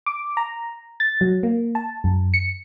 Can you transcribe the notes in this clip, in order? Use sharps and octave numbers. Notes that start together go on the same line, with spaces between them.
D6
A#5
A6
F#3
A#3
A5
F#2
C#7